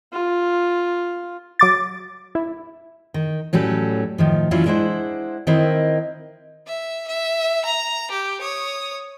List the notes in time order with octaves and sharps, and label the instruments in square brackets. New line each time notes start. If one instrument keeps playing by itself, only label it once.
[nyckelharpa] F4
[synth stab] F#3 D6 A6
E4
[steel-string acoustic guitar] D#3
A2 F#3 G3 C#4 A4
A2 D#3 F3
E3 F#3 C#4 D4 E4 F4
G#3 D4 E4 C5 F#5
D#3 C4 E4 A#4 D#5
[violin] E5
E5
A#5
G4
C#5 D#6